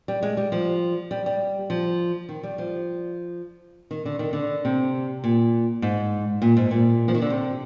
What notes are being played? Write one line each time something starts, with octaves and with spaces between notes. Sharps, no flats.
G3
G#3
G3
F3
G3
G3
F3
D#3
G3
F3
D#3
D3
D#3
D3
C3
A#2
G#2
A#2
G#2
A#2
F3
D#3
D3
C3